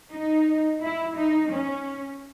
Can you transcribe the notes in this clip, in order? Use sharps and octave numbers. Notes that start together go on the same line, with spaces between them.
D#4
E4
D#4
C#4